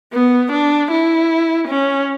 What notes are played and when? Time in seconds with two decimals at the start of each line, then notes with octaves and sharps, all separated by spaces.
0.13 B3
0.52 D4
0.91 E4
1.68 C#4